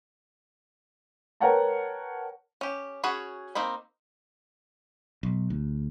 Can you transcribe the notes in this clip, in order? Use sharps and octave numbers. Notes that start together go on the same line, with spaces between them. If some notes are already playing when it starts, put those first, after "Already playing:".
A#4 B4 C#5 F#5 G5 A5
C#4 G4
C#4 F#4 G#4 C#5 B5
A#3 C4 D#4 B5
B1
D2